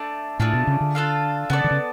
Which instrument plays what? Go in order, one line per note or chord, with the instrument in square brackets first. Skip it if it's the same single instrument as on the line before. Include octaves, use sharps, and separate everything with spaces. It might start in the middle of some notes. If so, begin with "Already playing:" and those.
Already playing: [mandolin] A3 D4
[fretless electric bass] A2 [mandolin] A3 D4 F4 G#4
[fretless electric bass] B2
C#3
D3
[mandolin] D4 F4 A4 F5
[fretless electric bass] C#3 [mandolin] B3 F#4 A4 D5
[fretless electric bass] D3
C#3